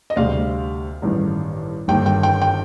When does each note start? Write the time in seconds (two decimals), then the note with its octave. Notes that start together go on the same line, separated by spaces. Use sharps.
0.10 D#5
0.16 D2 C3 G3 D5 F5
1.02 A1 G2 D#3
1.88 G1 G2 D#3 A#3 G5
2.06 G5
2.23 G5
2.42 G5